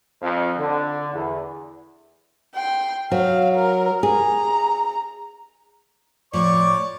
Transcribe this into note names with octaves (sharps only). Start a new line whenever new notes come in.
F2
D3
E2
G5 C6
F#3 F5
A#4
G#4 A#5
A2 F3 C#5 D5 C#6 D6